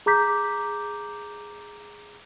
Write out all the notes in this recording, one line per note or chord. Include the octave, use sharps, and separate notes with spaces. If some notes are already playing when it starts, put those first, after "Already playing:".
G#4 A#5 D6 G6 B6